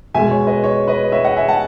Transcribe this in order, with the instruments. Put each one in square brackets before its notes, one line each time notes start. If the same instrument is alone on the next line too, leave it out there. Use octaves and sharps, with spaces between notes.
[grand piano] B2 G#3 E5 G#5
C#5
B4 D#5
C#5
B4 D#5
C#5 E5
D#5 F#5
E5 G#5
F#5 A5